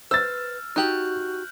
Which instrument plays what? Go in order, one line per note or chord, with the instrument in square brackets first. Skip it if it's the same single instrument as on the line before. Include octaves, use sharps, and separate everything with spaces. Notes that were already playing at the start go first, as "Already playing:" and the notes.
[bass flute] B4 [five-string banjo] C5 [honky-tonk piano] E6 A6 [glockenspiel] F6
[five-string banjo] D#4 G4 [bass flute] F#4 [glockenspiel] F#6 G6 F#7